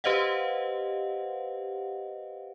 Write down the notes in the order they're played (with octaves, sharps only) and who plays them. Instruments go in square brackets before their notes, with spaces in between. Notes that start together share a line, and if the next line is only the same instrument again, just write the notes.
[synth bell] G4 B4 C5 D#5 F5 F#5